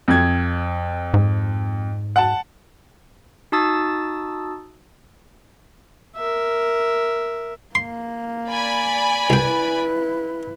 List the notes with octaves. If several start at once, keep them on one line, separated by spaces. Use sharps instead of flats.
F2 G#6
G#2
F#5 A5
D#4 F#4 A5 D#6 E6 A6
A#4 E5
A#3 C6
D5 G#5 B5
C2 E4 B4 G5